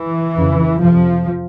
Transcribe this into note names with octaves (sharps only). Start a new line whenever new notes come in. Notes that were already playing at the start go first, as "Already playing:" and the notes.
Already playing: E3
F2 C#3
F2 C3 F3